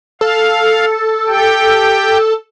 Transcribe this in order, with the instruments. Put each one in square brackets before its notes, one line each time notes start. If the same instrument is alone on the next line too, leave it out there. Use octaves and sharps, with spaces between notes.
[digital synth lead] A4 [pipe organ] F5
[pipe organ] G4 G5